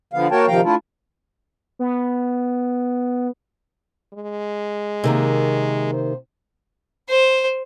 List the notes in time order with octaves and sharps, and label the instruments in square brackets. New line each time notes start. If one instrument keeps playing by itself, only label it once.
[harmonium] D3 F3 B3 F5
A#3 F#4 A#4 C#5 G5 A5
C3 D#3 F3 F5 G5 A#5
A3 D4 E4 F4
[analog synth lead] B3
[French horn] G#3
[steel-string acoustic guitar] C3 D#3 A#3
[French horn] C5
[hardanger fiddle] C5